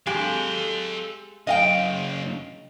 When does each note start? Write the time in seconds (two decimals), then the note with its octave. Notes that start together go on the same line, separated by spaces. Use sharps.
0.07 G#3 G4 A4 F5
1.47 F#2 C#3 D#5 F5 G5